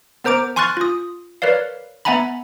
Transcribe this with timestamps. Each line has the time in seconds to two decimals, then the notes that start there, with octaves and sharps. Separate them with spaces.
0.24 B3 A#4 C5 A#5 D6 D7
0.56 G#5 C6 C#6 F6 F#6 A6
0.77 F4 D#6
1.42 A#4 B4 C#5 D5 F5
2.05 B3 E5 F#5 G#5 A#5 B5